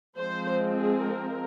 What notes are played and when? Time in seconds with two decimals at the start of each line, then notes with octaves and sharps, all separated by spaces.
0.17 F3 G#3 C4 C5
0.78 G#4
1.10 A#4